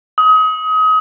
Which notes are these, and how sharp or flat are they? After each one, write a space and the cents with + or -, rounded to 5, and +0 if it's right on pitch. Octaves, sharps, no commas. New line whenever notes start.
D#6 +30